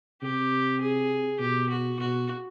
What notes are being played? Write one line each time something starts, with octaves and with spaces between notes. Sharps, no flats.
C3 G4
G#4
B2 G4
F#4
B2 F#4